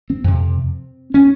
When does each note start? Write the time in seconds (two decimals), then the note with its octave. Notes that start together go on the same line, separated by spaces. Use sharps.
0.10 C4
0.24 F2 C3
1.14 C#4